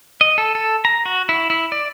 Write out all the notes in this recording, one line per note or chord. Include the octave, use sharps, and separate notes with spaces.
D#5
A4
A4
A#5
F#4
E4
E4
D5